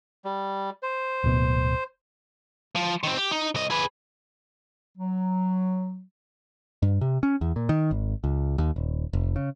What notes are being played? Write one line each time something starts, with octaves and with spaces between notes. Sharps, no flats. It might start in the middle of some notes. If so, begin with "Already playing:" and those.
G3
C5
D1 B2
F3
D#3 C4
G4
D#4
C2 D#5
G#4 B4
F#3
G2
C3
C#4
E2
A#2
D#3
G#1
C#2
D#2
D#1
F1
C#3